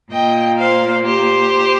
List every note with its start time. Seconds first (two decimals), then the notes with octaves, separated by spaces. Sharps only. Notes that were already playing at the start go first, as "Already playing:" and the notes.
0.11 A#2 A#3 D#5 G5
0.58 C5 F5
1.05 G4 C5